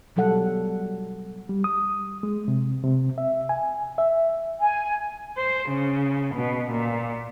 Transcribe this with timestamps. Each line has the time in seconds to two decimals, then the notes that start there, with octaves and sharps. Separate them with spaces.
0.16 B2 F#3 G3 A4 F#5
1.49 G3
1.64 D#6
2.23 G#3
2.48 C3
2.83 C3
3.18 E5
3.49 G#5
3.98 E5
4.60 G#5
5.36 C5
5.68 C#3
6.34 B2
6.70 A#2